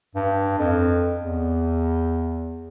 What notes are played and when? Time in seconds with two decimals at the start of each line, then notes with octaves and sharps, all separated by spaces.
0.15 G2
0.58 F2
1.18 E2